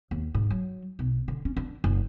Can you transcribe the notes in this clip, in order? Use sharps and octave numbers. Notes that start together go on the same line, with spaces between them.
D#2
G#2
F#3
B1
D3
C#4
D4
F#1